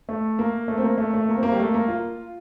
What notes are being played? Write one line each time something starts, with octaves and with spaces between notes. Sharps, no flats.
A3
A#3
A3
C4
A#3
A3
A3
A#3
C4
A#3
G3
A3
A#3
F4